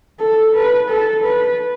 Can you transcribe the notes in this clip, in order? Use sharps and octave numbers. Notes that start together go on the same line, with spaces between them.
A4
B4
A4
B4